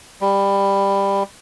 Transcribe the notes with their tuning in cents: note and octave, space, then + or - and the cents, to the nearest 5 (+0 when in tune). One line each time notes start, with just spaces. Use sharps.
G3 +15